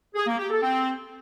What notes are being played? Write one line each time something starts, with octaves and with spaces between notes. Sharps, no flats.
G#4
A#3
G4
A4
C4